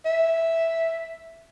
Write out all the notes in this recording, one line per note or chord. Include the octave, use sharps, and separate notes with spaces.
E5